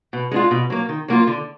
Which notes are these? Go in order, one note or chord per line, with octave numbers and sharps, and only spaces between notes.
B2
G#3 D4 F4
B2
F#3 A#3
D#3
F#3 A#3 F4
D3